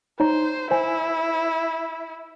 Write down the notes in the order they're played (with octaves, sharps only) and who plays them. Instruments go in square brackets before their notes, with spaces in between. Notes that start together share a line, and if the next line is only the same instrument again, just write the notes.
[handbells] D#4 C#5 A#5 [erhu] C5
[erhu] E4 [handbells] C5 G#5